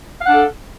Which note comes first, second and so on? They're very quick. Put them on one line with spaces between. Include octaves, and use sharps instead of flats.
F5 F#5 D4 A4